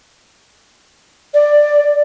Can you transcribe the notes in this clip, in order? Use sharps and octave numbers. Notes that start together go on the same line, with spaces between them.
D5